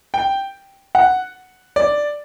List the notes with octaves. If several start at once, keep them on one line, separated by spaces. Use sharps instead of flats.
G5
F#5
D5